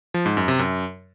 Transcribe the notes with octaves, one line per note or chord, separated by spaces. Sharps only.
F3
G#2
F#2
C3
F#2